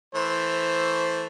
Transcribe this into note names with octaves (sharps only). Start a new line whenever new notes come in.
E3 A3 C5